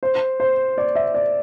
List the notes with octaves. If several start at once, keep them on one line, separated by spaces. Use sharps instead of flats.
C5
C5
D5
E5
D5